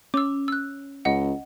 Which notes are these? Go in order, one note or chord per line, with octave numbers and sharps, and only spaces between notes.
C#4 D6 E6
E6 F#6
C#2 D#5 F#5